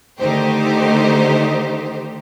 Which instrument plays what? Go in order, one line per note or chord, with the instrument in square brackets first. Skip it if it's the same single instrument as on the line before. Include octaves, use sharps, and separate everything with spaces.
[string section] D3 D#3 A3 D#4 G4 C5